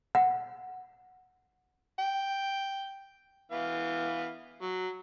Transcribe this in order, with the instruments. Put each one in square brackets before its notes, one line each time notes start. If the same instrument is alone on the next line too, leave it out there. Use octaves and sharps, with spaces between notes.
[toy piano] F#5
[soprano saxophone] G5
[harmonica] E3 B3 F5
F#3